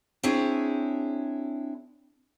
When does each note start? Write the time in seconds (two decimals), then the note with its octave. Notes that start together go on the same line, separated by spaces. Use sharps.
0.23 C4 D4 E4 G#4 C#5